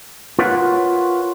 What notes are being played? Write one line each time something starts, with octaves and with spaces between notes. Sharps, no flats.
F4 A#4 B4 C#5 F5 F#5